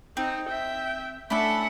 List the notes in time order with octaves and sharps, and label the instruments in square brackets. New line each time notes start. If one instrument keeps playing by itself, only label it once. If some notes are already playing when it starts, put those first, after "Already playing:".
[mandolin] C4 [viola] D#4
[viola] E5 G5
[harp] A3 C#4 D4 [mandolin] E4 A4 [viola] E5 F#5